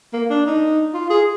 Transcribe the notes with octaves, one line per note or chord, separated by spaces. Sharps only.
A#3
D4
D#4
F4
G#4